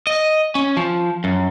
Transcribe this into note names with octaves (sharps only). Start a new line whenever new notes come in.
D#5
C#4
F3
F#2